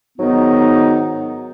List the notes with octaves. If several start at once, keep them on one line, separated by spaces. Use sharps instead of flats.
G#2 D#3 F#3 B3 D#4